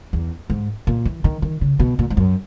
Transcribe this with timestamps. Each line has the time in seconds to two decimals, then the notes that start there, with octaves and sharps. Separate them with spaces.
0.13 E2
0.50 G#2
0.87 A#2
1.05 E3
1.24 D#3
1.42 D#3
1.61 C#3
1.79 B2
1.99 A#2
2.10 G#2
2.17 F#2